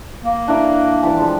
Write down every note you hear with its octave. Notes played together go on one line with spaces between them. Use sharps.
A#3
D4 E4 A#4
E3 G3 A5
F3 G#3